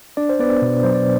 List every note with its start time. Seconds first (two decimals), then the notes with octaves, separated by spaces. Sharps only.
0.17 D4 D5
0.29 C5
0.39 B3 B4 D5
0.62 B2
0.84 F#3 C5
0.94 D5